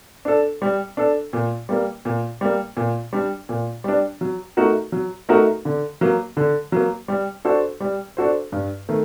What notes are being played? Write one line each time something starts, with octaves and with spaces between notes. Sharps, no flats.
D4 A4
G3
D4 A4
A#2
G3 A#3
A#2
G3 A#3
A#2
G3 D4
A#2
G3 D4
F#3
A3 D#4 F#4 A#4
F#3
A3 D#4 F#4 A#4
D3
F#3 A#3
D3
F#3 A#3
G3
D4 F#4 A4 C5
G3
D4 F#4 A4 C5
G2
D#3 A3